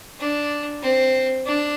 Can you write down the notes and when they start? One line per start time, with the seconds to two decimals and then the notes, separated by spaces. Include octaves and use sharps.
0.19 D4
0.82 C4
1.46 D4